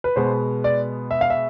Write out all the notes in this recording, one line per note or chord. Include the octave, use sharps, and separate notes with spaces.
B4
B2 G#3 B3 C5
D5
E5
F5
E5